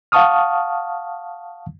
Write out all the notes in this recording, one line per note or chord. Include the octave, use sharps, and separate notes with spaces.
F5 F#5 A5 C#6 D#6 F6